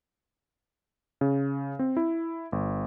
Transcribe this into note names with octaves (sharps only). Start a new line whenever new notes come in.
C#3
C4
E4
G1